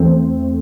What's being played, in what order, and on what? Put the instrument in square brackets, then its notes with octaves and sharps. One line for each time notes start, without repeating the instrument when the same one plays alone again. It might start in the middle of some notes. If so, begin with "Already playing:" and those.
Already playing: [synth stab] E2 A3 C4